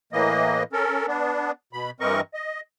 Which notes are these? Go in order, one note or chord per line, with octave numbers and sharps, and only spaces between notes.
A2 E3 A#3 D#5
C#4 A4 A#4
B3 D4
B2 B5
G2 E3 C4 A#4 D#5 C#6
D#5